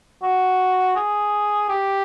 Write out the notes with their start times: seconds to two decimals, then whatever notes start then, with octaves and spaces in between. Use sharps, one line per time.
0.23 F#4
0.96 G#4
1.69 G4